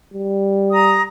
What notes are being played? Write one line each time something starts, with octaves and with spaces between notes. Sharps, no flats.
G3
A#5 D#6